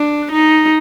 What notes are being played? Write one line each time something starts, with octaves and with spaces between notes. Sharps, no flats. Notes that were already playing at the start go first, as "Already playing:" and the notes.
Already playing: D4
D#4